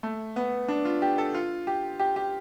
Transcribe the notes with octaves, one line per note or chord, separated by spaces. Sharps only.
A3
B3
D4
F4
G4
A4
F4
G4
G4
G4